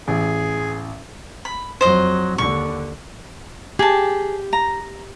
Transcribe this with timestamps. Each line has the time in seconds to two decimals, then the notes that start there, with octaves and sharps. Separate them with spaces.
0.08 A1 G#4
1.45 B5
1.81 F2 F#3 C5 D#5
2.38 D#2 D3 C#6
3.79 G4 G#4 A5
4.53 A#5